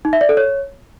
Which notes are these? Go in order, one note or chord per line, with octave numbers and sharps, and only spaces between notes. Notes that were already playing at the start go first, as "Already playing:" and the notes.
D#4
E5
D5
A4
C#5